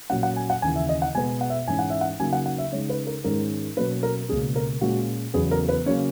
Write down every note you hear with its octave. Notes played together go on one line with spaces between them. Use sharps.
A#2 F#3 C#4 F#5
F#5
G#5
F#5
D#2 C#3 E3 G#5
E5
D#5
F#5
B2 G#3 B3 G#5
F#5
E5
G#2 E3 G#3 C#4 G#5
F#5
E5
F#5
C#3 F#3 A#3 D#4 G#5
F#5
F#5
E5
C#3 G#3 D#4 C#5
B4
A#4
G#2 D#3 G#3 C#4 A#4
B2 F#3 A#3 C#4 B4
A#4
C#2 B2 A#3 C#4 G#4
A#4
A#2 G#3 C#4 F#4
E2 C#3 F#3 B3 G#4
A#4
B4
C#3 F#3 A#3 C#4 C#5